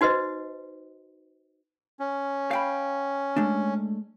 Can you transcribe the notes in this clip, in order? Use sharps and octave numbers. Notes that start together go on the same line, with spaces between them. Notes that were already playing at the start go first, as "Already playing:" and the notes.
D#4 F#4 B4 C5 D#5
C#4
F5 G5 B5
G#3 A3 D4